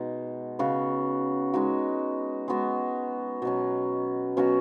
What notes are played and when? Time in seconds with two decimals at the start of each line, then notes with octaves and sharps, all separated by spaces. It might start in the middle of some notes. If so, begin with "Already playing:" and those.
Already playing: B2 G#3 D#4
0.59 C#3 B3 F#4
1.54 G#3 D#4 F#4
2.48 G#3 B3 F#4
3.42 B2 F#3 C#4
4.37 B2 F#3 C#4 F#4